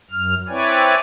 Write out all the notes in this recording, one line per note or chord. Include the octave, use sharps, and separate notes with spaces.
F#2 F6
C4 E4 B4 C#5 D5 G#5